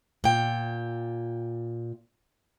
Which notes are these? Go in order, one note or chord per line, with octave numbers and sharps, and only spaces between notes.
A#2 G5